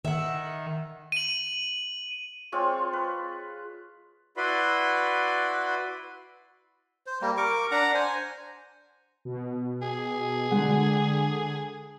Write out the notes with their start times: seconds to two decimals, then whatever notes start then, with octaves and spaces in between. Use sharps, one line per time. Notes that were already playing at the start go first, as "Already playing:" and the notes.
0.05 D#3 E5 F#5
1.12 D#7 F#7
2.52 G#3 C4 F4 C#5
2.93 B4
4.37 E4 F#4 B4 D5 B5 C6
7.06 C5
7.21 G3 A#3
7.37 A#4 C#6 D6
7.71 D4 F#5 A#5
7.95 C5 G#5
9.25 B2
9.82 G#4
10.51 D3 G#3 F#5